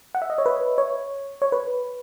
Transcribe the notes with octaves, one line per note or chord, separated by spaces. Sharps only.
F#5
E5
D#5
C#5
B4
C#5
C#5
B4